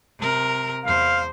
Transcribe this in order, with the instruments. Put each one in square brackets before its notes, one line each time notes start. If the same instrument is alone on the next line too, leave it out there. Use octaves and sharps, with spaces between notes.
[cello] C3 A#4
[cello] E2 C5 [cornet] F5